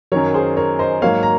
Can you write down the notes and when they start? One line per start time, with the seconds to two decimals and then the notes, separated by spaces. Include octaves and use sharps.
0.12 F#2 D#3 F#3 A#4 C#5
0.34 G#4 C5
0.57 A#4 C#5
0.79 C5 D#5
1.02 G#2 F#3 A#3 C#5 F5
1.23 A#5